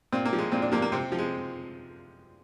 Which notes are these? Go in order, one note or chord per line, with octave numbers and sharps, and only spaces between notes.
A#2 C4
A#3
F3
G#3
A#2 C4
D4
F3 A#3
A#3
C3 C4
F3
G#3